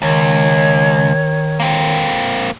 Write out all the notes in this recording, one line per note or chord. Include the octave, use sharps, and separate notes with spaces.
C#2 D#3 C#5
A#3 C4